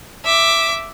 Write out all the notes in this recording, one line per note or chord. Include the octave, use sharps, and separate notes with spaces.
E5 D6